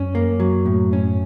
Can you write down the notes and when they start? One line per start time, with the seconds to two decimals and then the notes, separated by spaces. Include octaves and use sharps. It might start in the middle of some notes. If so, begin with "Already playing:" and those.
Already playing: F#2 C#4
0.15 A#3
0.40 F#3
0.66 A2
0.93 C#4